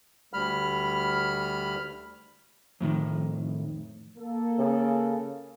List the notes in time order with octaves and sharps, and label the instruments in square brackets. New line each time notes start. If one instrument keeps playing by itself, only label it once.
[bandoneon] D2 G3 B5 F6
[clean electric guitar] F2 A2 D3 D#3
[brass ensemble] A#3 A4
[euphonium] C#3